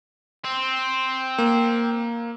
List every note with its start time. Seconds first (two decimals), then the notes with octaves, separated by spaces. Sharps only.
0.44 C4
1.38 A#3